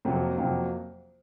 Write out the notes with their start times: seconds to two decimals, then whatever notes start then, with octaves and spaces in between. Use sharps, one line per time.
0.05 F2 C3 F#3 A#3 F4
0.38 F2 C3 F#3 A#3 F4